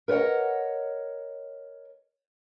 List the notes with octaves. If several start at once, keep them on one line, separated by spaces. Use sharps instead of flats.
A#4 B4 C#5 D#5 F#5